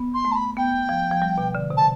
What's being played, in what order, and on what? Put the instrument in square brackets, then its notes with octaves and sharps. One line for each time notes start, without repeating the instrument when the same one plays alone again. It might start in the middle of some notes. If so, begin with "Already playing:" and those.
Already playing: [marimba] B3
[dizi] C6
[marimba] A3
[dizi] A5
B5
[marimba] B3 [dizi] G5
[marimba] F3
F3
G3
B2
D3
C3
[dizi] A5